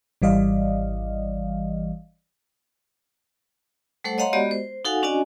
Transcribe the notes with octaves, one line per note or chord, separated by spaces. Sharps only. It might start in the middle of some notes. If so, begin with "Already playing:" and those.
G#1 E3 G3 D5 D#5 F5
G3 A3 A4 C5 F#5
C#5 D#5 F5 F#5 A#5 C6
G#3 B3 F#4 G4 D5 D#5
C5
D#4 F#4 A4 F5 F#5 G#5
C#4 D4 F#4 D5 D#5 G#5